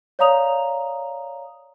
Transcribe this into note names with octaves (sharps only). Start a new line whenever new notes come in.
C#5 D5 F5 A#5 D#6 F7